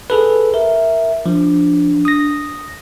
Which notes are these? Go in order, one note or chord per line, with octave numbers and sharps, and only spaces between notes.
G#4 A4 B4
A#4 E5
F3 D4
D#6 A#6